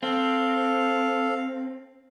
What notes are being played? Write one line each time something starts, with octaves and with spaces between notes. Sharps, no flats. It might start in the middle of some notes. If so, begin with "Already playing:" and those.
C4 A4 F5